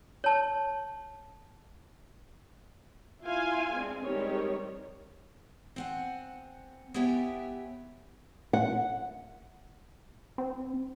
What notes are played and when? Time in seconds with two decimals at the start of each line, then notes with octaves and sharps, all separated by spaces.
0.24 C#5 A5
3.24 E4 F4 F5 G#5 C6
3.74 G#3 C4 D4
4.04 D#3 G3 G#3 C4 C#5
5.76 C4 F#5 G#5
6.94 B3 E4 G4 C#5 E5 G#5
8.53 F#5
10.38 C4